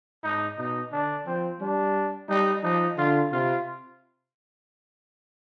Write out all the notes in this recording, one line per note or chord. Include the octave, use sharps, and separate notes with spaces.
G#2 D#4
B2 D#4
D3 D4
F3 C4
G3 D4
G3 D#4
F3 D#4
D3 F4
C3 F4